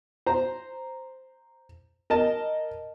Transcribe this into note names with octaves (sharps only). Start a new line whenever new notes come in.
C5 A#5
A#4 D#5 A5